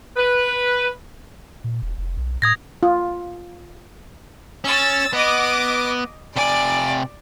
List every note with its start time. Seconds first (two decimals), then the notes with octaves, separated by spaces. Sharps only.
0.17 B4
1.64 A#2
1.82 E1
1.98 F1
2.17 B1
2.42 A2 D#6 G#6 A#6
2.83 F4
4.64 C#4 E6 A6
5.13 B3 D#5 D6
6.36 C3 D5 G#5